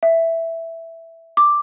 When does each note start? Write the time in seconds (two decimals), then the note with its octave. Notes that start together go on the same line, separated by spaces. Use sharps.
0.03 E5
1.37 D6